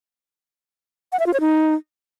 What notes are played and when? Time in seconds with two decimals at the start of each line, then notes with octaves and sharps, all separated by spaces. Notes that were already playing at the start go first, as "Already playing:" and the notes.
1.12 F#5
1.19 E5
1.27 F4
1.34 C#5
1.41 D#4